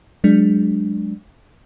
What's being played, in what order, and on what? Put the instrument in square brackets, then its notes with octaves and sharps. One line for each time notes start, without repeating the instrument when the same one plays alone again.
[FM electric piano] F#3 G#3 D4